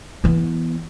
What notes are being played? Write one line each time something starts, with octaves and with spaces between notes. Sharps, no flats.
E3 B3